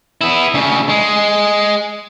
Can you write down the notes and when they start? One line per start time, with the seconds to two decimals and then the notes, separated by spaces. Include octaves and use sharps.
0.21 B3 E4
0.54 D2 C#3
0.89 G#3